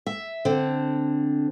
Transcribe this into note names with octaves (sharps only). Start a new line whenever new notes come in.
E5
D3 C4